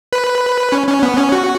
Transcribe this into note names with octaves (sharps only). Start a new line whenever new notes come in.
B4
C#4
C#4
B3
C#4
F#4